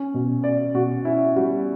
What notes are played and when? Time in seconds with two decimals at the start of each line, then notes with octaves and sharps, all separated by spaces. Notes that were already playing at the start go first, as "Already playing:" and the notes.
Already playing: C#4
0.14 B2
0.44 C#4 D5
0.74 B2 F#4
1.05 C#4 E4
1.36 G3 F#4